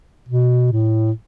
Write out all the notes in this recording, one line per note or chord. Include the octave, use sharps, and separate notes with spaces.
B2
A2